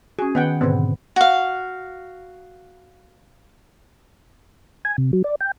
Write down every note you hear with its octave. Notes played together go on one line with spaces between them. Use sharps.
C#4 F#4 G#4
D#3 B3 F#5 G5
G#2 B2 D3 B3 C4
F#4 F5
G#5
C3
F#3
D5
G5